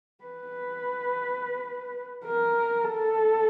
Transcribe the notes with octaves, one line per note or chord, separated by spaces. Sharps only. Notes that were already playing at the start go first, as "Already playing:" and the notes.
B4
A#4
A4